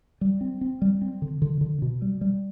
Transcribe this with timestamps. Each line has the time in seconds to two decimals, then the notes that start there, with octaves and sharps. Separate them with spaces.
0.21 G3
0.41 C4
0.61 C4
0.82 G3
1.02 C4
1.22 D3
1.42 D3
1.61 D3
1.82 B2
2.02 G3
2.21 G3